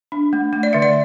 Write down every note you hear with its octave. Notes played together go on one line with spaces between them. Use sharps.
D4
A3
A3
D5
D3 E5
D5